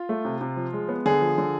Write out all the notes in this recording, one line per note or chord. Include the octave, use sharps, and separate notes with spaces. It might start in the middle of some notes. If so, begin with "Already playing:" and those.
Already playing: F4
A3
C3
C3
F3
G#3
B3
D3 G#4
F3
D3